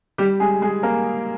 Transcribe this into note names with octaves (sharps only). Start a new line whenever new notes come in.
G3 G4
G#3 G#4
G#3 G#4
A#3 A#4